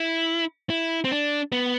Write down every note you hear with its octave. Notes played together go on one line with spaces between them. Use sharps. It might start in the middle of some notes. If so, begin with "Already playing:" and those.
Already playing: E4
E4
C4
D4
B3